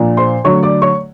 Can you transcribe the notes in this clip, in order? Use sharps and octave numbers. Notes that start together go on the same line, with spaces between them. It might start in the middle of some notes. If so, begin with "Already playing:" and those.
Already playing: A#2 F3 A#3 D4
C5 C6
D3 F#3 A3 C#5 C#6
D5 D6
C#5 C#6